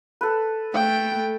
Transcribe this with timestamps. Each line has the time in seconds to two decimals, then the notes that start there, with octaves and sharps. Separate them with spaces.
0.21 A4 B4
0.74 A3 G5